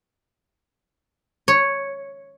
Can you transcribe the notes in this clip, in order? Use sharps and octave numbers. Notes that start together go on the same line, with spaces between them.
C#5